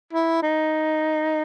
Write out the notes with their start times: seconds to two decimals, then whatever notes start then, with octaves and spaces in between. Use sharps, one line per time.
0.13 E4
0.43 D#4